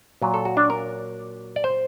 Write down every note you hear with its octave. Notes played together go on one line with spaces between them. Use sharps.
A#2 F#3
A4
F#4
D4
A#4
D5
C5